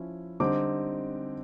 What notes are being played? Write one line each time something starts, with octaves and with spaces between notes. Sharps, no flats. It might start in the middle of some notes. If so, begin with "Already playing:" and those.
Already playing: F3 C#4 E4
D3 G3 C4 D#4 D6